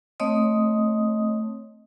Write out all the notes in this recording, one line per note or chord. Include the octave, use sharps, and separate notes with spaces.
A3 C4 C#5 D#5 D#6